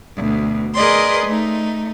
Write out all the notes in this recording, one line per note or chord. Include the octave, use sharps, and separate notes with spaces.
D2 B2
G#4 A#4 B4 D5 D#5 C6
A3 D#4